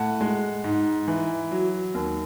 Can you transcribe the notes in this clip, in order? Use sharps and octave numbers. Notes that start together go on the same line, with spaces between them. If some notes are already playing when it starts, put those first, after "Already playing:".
Already playing: A2 F#5 A5
G#3
G#2
E3
F#3
D#2